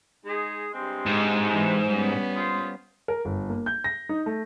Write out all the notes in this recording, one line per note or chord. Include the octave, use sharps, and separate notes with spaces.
G#3 D#4 G#4
G2 G#3 C4
G#2
E3
G3 B3 C#4
F4 G#4 C5
A#4
G1
A#3
G6
A#6
D#4
A3